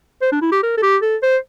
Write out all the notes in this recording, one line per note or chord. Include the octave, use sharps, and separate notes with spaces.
C5
D4
E4
G4
A#4
A4
G4
A4
C5